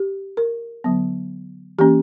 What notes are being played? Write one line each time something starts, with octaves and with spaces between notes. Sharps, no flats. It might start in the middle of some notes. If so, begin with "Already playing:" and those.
Already playing: G4
A#4
D3 F#3 B3
E3 A#3 C#4 G4